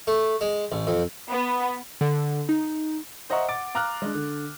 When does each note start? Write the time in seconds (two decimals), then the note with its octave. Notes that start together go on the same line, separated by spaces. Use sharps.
0.07 A3
0.41 G#3
0.72 A1
0.87 F2
1.30 B3
2.01 D3
2.49 D#4
3.30 C5 D#5 E5 F#5 A#5 C#6
3.49 F#5 D6 A6 D7
3.75 F5 A#5 D6 F6 F#6
4.02 G#3 D4
4.15 D3